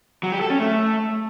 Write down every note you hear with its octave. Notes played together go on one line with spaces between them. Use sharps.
F#3
G4
A4
C#4
A3